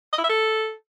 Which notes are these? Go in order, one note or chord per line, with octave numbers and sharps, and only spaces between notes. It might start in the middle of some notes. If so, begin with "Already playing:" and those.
D#5
E4
E5
A4